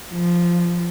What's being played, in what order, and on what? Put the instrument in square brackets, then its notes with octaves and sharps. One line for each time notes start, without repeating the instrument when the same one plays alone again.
[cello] F3